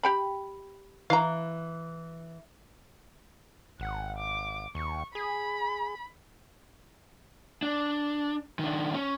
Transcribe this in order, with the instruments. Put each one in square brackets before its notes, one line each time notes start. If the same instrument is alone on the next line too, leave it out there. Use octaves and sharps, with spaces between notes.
[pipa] G4 G5 B5
[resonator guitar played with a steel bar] E3 [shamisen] F5 A#5
[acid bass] G#1 [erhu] F#5
[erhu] D6
[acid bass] D#2 [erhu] C#6
[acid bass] G#4 [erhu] B5
[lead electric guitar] D4
D#3 D4
C#4